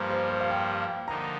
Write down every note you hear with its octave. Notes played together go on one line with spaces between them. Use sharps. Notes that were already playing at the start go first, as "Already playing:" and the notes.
Already playing: G2 F3 A#3 C5
C5
C5
F5
G5
D3 F3 A#3 D#4 A#5